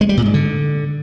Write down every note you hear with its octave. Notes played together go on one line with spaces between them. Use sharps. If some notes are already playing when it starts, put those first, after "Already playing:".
G#3
G3
A#2
G#2
D3